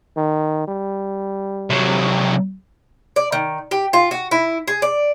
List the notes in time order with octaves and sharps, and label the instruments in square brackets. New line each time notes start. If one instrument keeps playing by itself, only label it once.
[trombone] D#3
G3
[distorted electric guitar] C3 F#3
[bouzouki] D5
D#3
G4
F4
F#4
E4
G#4
D5